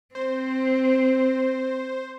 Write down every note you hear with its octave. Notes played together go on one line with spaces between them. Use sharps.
C4 C5